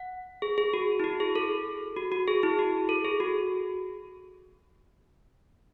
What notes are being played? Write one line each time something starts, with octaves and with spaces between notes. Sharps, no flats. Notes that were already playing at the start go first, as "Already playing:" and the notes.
Already playing: F#5
G#4
G#4
F#4
E4
F#4
G#4
A4
F#4
F#4
G#4
E4
F#4
A4
G#4
F#4